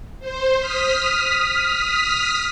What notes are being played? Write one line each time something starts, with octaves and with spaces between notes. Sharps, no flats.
C5
D#6 F6 B6